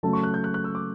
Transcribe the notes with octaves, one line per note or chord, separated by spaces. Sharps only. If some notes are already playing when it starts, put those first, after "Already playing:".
C#3 F#3 A3 A5
C#6
F#6
G6
F#6
F#6
E6
D6